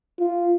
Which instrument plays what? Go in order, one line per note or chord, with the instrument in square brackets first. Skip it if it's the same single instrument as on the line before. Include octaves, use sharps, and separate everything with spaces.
[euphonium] F4